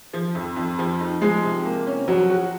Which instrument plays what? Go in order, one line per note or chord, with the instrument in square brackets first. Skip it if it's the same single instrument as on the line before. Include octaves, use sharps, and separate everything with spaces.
[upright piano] F3
F2
F2
F3
D#4
[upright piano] F3 [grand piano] G#3
[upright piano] C3
A#3
C#4
[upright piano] F3 [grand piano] F#3
[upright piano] F#4